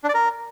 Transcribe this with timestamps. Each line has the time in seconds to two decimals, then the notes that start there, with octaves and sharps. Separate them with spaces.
0.04 D4
0.09 D5
0.14 A#4